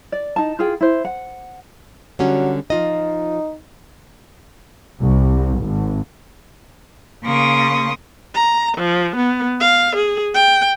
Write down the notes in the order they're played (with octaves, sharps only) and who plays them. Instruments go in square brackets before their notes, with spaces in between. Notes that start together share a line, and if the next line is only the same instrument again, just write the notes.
[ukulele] D5
D#4 A5
F4 G#4 G5
E4 C5
F#5
[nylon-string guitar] D3 G3 C#4 [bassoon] F#3
[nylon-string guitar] F3 F4 D#5 [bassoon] D#4
[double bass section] C2
G#1
[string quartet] C#3 A#3 C6 C#6 D#6
[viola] A#5
F3
B3
F5
G#4
G5